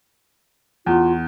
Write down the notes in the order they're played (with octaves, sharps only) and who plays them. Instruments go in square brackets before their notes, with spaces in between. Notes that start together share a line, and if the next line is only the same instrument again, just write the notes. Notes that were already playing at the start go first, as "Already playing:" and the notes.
[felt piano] E2 [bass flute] F4